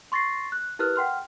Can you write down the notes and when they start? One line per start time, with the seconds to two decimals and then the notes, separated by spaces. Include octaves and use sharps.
0.12 C6 C#6 A6 A#6 C7
0.52 F#6
0.79 E4 G4 A#4 B4 F6 F#6
0.96 F#5 G5 C6 F6